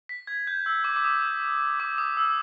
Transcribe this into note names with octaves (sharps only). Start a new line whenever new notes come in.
B6
G#6
G6
E6
D6
D6
D#6
D6
D#6
E6